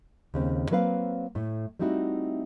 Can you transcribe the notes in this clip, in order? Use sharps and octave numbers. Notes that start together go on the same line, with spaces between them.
D#2 C#3 C4
F#3 A#3 C4 B4 E5 F5
A2 A3
G3 A3 C4 D#4 E4 F#4